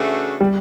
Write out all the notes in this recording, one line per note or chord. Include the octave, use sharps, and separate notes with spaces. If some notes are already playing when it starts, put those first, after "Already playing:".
Already playing: C#3 E3 A3 D4 F#4
G3